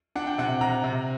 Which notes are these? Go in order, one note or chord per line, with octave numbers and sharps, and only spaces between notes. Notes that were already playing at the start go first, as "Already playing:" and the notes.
D4 F#5
G5
C3 F#5
C3 A#5
C3